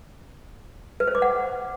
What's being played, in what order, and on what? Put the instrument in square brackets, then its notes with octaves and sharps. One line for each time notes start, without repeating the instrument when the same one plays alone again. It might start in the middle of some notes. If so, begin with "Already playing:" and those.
[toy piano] B4
C5
D6
F#5